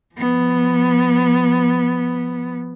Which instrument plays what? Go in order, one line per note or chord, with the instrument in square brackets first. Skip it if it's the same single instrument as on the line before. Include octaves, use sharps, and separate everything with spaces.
[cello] F3 B3